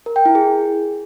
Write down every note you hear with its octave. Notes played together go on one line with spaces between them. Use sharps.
A#4
G5
E4
G#4